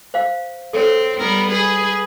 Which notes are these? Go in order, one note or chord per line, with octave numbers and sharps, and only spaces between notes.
C5 F5
C4 A4 C#5
G3 B3 A#4
G#4 B4